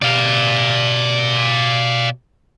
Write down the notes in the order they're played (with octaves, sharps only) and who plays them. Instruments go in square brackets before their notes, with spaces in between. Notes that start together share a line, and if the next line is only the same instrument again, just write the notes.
[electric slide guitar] B2 G4 [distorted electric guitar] D5 F5